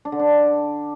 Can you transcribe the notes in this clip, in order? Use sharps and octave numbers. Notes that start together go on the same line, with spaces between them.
D4
D3
D4